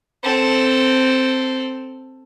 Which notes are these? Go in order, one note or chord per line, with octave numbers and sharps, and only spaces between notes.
C4 A4